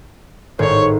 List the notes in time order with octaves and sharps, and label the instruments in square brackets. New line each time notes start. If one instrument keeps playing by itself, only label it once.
[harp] G#1 A2 C5 [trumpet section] C#5